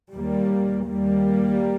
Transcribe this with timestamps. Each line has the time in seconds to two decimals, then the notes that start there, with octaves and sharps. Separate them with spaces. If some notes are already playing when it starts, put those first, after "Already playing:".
0.14 D#2 G3 A#3
0.86 D#2 G3 A#3